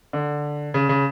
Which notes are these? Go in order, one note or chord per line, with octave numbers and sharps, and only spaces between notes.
D3
C#3
C#3